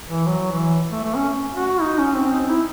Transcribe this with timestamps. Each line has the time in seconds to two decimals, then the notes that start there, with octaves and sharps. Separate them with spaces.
0.09 E3
0.26 F#3
0.52 E3
0.91 A3
1.04 A3
1.16 C#4
1.55 F#4
1.81 D#4
1.98 C#4
2.15 C4
2.32 D#4
2.49 E4